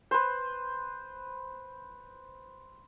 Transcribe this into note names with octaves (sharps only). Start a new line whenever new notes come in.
B4 C5